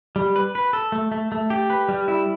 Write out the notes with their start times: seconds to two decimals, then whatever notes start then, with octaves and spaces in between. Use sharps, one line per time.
0.16 G3
0.36 B4
0.55 B4
0.73 A4
0.92 A3
1.12 A3
1.32 A3
1.50 G4
1.70 B4
1.89 G3
2.08 E4